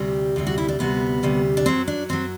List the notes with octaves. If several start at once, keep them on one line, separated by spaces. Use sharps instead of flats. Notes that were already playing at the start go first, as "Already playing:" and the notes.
Already playing: D2 C3 G3
D2 C3 G3
F#4
E4
D4
D2 C3 G3 B3
D2 C3 G3
D4
F#2 F#3 C4
D4
F#2 F#3 C4